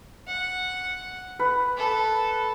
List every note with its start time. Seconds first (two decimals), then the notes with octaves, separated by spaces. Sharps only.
0.27 F#5
1.39 B4
1.77 A4